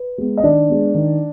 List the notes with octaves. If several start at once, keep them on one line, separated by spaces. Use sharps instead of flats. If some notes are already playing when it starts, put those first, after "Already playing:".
Already playing: B4
G#3 B3
D#5
D#3 D4 D5
G#3 B3
D#3